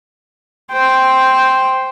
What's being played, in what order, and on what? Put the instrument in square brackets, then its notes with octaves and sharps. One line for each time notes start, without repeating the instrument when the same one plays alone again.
[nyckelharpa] C5 G5